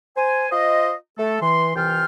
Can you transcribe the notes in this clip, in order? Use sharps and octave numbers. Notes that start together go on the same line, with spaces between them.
C5 G#5
F4 C5 D#5
A3 A4
E3 C6
C2 E3 F4 G5 F6